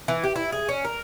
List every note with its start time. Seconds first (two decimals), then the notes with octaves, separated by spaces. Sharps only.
0.08 E3
0.24 G4
0.36 E4
0.52 G#4
0.69 C#4
0.85 A#4